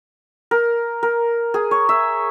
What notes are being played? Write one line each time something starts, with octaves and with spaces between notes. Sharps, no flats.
A#4
A#4
G#4
C#5
E5